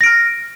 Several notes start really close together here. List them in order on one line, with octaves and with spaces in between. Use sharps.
A#6 D7 F6